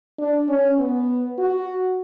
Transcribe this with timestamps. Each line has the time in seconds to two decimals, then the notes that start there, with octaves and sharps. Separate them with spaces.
0.19 D4
0.49 C#4
0.78 B3
1.39 F#4